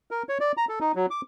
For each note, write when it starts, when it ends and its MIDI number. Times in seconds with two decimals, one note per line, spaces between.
0.11 0.23 70
0.29 0.38 73
0.41 0.52 74
0.57 0.65 82
0.69 0.79 69
0.81 0.92 63
0.95 1.06 54
1.11 1.21 86